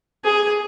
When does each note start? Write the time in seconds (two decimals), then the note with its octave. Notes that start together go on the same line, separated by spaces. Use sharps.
0.24 G#4